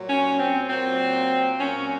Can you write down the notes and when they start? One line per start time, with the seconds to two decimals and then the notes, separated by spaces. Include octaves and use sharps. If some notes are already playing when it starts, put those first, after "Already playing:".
Already playing: A#2 F#3
0.09 C#4
0.39 C4
0.69 A#2 F#3 C4
1.60 A#2 F#3 C#4